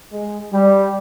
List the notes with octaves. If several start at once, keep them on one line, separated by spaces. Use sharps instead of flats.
G#3
G3